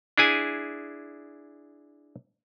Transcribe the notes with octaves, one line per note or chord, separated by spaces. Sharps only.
D4 E4 G#4 G#5